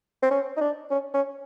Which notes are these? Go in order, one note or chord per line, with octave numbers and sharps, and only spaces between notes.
C4
C#4
D#4
D4
C#4
C#4